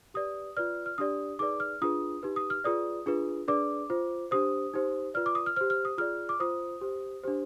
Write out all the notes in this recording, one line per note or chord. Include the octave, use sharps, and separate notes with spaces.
G4 B4 D5 D#6
F4 B4 D5 F6
F6
D4 G4 D5 D#6
D#4 G#4 B4 D5 D6
F6
D4 F4 G#4 B4 D#6
D#4 G4 B4
D#6
F6
F4 G#4 B4 D5 D#6
D4 F4 G#4 B4
D4 G#4 B4 D5 D6
F4 C5
D4 G4 C5 D#6
D#4 G4 C5
F4 B4 D5 F6
D6
D#6
F6
G4 C5 F6
F6
D#6
F4 G#4 D5 F6
D6
F4 C5 D#6
G4 C5
D4 G4 C5